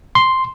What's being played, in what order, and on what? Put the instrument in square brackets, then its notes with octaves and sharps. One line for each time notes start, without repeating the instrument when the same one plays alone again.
[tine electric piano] C6